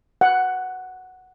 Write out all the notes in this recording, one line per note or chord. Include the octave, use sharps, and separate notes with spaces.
F#5